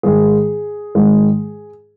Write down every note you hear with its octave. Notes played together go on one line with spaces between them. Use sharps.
G#2 D#3 G#3 G#4
G#2 D#3 G#3